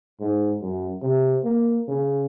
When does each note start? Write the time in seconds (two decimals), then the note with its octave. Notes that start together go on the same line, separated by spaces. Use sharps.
0.20 G#2
0.62 F#2
1.02 C3
1.44 A#3
1.88 C#3